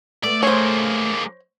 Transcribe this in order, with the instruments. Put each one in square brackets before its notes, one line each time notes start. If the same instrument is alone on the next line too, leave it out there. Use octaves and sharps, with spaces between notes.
[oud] A3 B3 [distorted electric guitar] D5
[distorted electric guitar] G#3 A#3 [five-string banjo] C5 C#5